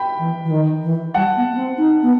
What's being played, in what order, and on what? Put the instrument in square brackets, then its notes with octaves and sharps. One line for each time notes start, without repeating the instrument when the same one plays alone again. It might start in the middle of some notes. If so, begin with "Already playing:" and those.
Already playing: [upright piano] G5 B5
[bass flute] E3
E3
D#3
E3
[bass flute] G3 [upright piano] F#5 A5
[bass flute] B3
B3
C4
D#4
B3